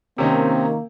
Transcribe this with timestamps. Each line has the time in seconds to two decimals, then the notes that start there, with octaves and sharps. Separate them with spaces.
0.18 C3 D#3 A#3 C4 C#4 D#4